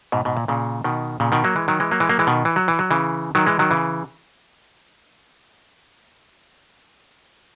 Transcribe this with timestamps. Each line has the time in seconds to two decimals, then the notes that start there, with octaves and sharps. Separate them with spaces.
0.12 G#2 B2
0.25 G#2 B2
0.37 A#2
0.48 A#2 C#3
0.84 B2 D#3
1.20 A#2 C#3
1.32 B2 D#3
1.44 F#3 A#3
1.56 E3 G#3
1.68 D#3 F#3
1.80 E3 G#3
1.91 F#3 A#3
2.00 E3 G#3
2.09 F#3 A#3
2.19 E3 G#3
2.27 B2 D#3
2.45 E3
2.56 F#3
2.68 E3
2.79 F#3
2.91 C#3 E3
3.35 D#3 F#3
3.46 E3 G#3
3.59 D#3 F#3
3.71 C#3 E3